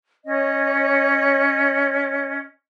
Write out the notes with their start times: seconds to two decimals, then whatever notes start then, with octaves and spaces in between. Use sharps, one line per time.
0.26 C#4 C#5 D#5